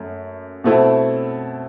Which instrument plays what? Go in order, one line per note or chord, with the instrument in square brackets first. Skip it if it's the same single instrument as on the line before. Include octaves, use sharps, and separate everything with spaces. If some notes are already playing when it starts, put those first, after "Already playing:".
Already playing: [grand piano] F#2 A3
B2 A3 C4 E4